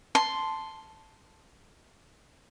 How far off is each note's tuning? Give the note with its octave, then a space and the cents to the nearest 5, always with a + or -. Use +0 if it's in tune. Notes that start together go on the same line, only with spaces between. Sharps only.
A5 +0 C6 +0